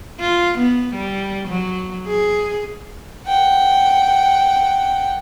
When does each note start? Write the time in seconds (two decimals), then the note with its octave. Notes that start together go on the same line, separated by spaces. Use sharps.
0.20 F4
0.59 B3
0.95 G3
1.48 F#3
2.08 G#4
3.27 F#5 G5